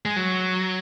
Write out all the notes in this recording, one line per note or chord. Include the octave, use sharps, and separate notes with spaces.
G#3
F#3